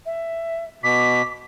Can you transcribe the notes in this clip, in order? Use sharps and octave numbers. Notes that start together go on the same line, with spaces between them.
E5
B2 D6 B6